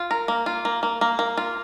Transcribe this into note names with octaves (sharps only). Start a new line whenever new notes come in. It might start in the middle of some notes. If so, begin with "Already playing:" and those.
Already playing: F4
A#4
A#3
F4
A#3
A#3
A#3
A#3
F4